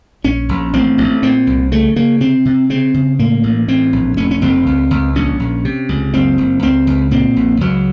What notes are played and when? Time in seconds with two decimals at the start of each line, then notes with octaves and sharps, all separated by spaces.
0.24 A#1 C#4
0.49 A#1
0.73 A1 C4
0.98 A1
1.22 A#2 C4
1.47 C2
1.72 C#3 A3
1.96 C#3 A#3
2.20 C3 C4
2.45 C3
2.70 C#3 C4
2.94 C#3
3.19 A2 A#3
3.43 A1
3.68 A2 C4
3.93 A#1
4.17 F1 C#4
4.31 C#4
4.41 F1 C4
4.67 C#2
4.91 C#2
5.15 A#1 C#4
5.40 A#1
5.65 C3
5.89 C#2
6.14 F#1 C4
6.38 F#1
6.63 C#2 C4
6.87 C#2
7.11 A#2 C4
7.36 A#1
7.61 C#2 F#3